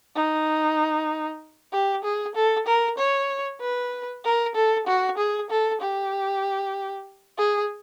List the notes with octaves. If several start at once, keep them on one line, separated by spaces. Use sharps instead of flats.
D#4
G4
G#4
A4
A#4
C#5
B4
A#4
A4
F#4
G#4
A4
G4
G#4